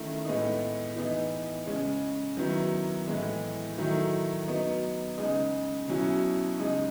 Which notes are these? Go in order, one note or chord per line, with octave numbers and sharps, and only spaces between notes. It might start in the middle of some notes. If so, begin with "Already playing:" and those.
Already playing: D#3 A3 C#4 E4
A2 G#3 B3 D#4
E3 B3 D#4
C#3 G#3 C#4
D#3 F#3 B3 E4
A2 E3 G#3 B3
D#3 F#3 A3 E4
F#3 B3 D#4
C#3 G#3 D#4
B2 F#3 C#4 E4
C#3 G#3 D#4